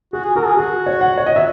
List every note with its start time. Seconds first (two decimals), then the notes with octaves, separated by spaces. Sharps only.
0.13 F#4 G#4
0.24 G#4
0.36 F#4 A#4
0.46 G#4
0.57 F#4 G#4
0.86 C#5
1.01 F#5
1.18 C#5
1.26 D#5
1.36 E5